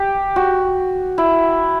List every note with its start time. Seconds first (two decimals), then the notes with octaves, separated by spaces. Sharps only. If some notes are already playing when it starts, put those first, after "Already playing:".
Already playing: G4
0.36 F#4
1.18 E4